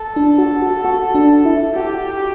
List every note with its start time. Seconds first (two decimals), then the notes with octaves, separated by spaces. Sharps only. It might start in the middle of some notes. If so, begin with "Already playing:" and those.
Already playing: A4
0.16 D4
0.38 F#4
0.62 F#4
0.85 F#4
1.15 D4
1.45 E4
1.76 F#4 G4